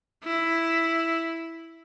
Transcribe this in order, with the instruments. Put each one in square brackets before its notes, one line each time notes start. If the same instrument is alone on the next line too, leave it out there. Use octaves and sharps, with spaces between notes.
[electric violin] E4